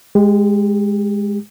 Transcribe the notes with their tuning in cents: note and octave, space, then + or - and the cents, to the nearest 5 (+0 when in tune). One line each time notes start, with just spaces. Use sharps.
G#3 -5 G4 +25